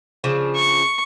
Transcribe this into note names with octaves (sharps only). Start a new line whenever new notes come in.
C#3 F3 D4
C#6